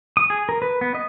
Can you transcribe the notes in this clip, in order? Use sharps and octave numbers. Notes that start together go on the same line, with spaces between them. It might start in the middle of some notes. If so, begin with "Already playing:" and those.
D#6
G#4
A#4
B4
B3
D#5